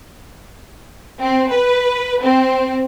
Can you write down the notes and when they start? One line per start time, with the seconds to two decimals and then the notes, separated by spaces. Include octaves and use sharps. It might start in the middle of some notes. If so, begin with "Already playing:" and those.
1.22 C4
1.52 B4
2.23 C4